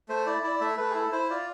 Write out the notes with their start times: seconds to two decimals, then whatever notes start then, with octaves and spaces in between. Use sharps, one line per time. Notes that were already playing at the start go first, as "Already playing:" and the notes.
0.09 A3 C5
0.26 E4 D5
0.43 E4 D5
0.56 D5
0.61 A3 E5
0.77 A3 B4
0.91 G#4
0.95 E4 A4
1.12 E4 C5
1.30 F4 D5